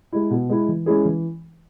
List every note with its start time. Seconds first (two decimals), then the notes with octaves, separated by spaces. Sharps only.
0.13 G#3 E4
0.30 B2
0.49 G#3 E4
0.68 E3
0.86 G#3 C#4 E4 G#4
1.05 E3